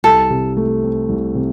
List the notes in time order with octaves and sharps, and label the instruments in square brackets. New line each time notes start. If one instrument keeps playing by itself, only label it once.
[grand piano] C2 [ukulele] A4
[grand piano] C3
A3
C4
C2
C3